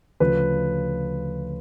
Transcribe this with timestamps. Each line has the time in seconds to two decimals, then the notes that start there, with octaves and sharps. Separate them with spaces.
0.20 D2 C#3 F3 B4